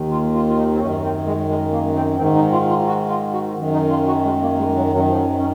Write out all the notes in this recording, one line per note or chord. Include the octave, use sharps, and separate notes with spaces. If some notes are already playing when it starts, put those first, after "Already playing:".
Already playing: D#2 D#3
F4
F4
F4
D#4
C4
F#2 D#3 C#4
C4
G#3
G#3
A#3
C4
G#2 D#3 C4
D#4
F4
F4
F#4
F4
F#4
F#2 D#3
D#4
F4
F#4
G#3
A#3
G#3
F#3
F#2 D#3 F#3
F3
F#3
C#4